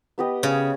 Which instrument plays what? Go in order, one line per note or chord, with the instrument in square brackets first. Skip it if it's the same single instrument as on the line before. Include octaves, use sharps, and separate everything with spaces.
[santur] B3 G4 B4 D#5
[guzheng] C#3